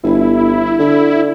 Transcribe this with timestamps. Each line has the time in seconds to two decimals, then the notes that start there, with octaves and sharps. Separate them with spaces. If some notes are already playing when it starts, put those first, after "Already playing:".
0.04 G1 E4
0.79 D3